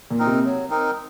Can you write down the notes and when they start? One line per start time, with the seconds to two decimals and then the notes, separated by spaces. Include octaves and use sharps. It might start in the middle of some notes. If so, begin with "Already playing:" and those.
0.11 A#2
0.19 C4 D#4 A#4
0.27 C3
0.45 F#3
0.70 C4 D#4 A#4